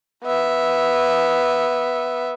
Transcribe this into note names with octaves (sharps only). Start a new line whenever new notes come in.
B3 E5